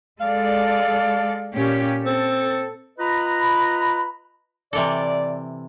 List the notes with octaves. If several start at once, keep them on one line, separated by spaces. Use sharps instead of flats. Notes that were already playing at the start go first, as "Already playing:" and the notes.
G#3 A4 D5 F5
A#2 C#4 G4
C4 A4
F4 B4 D#5 A#5 B5
C3 E3 A4 D5